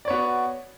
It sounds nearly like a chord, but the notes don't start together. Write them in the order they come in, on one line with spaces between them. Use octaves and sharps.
D5 C#5 B3 F#4